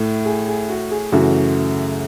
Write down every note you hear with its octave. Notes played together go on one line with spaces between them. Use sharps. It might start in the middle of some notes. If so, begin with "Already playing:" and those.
Already playing: A2 A3
G#4
G#4
F#4
G#4
F#2 C#3 E3 A3 F#4